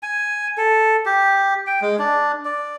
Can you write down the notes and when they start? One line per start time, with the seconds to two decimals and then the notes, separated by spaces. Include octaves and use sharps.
0.03 G#5
0.57 A4
1.06 G4
1.67 G5
1.82 G#3
1.99 D4
2.45 D5